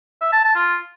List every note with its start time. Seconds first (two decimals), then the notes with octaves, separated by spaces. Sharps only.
0.21 E5
0.32 A5
0.44 A5
0.55 F4